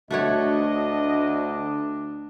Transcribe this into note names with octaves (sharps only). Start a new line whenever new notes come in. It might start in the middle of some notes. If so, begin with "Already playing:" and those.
D2 A3 D4 F#4 C#5 D#5